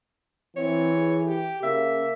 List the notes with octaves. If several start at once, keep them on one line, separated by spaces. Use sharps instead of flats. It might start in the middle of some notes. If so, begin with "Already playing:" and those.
E3 C4 C#5
G#4
G4
C#3 A#3 E5